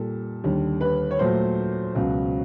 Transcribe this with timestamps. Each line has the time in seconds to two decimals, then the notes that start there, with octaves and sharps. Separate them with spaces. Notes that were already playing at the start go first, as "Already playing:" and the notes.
Already playing: A#2 G3 A4
0.44 D#2 D3 G3
0.81 B4
1.11 C#5
1.19 A#2 F#3 A3 C5
1.95 C#2 B2 F#3